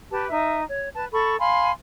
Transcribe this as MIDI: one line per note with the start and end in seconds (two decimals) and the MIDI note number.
0.10 0.26 67
0.10 0.26 71
0.10 0.26 81
0.29 0.62 63
0.29 0.62 76
0.69 0.90 73
0.95 1.06 71
0.95 1.06 81
1.12 1.36 69
1.12 1.36 83
1.12 1.36 85
1.39 1.71 77
1.39 1.71 80
1.39 1.71 83
1.39 1.71 84